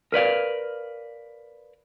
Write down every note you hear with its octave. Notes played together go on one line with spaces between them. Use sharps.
A#4 B4 D5 F5